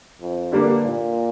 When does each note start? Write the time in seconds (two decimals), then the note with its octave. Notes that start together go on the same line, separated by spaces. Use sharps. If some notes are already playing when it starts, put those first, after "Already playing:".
0.21 F2
0.52 G2 D3 G3 A#3 D4
0.85 A#2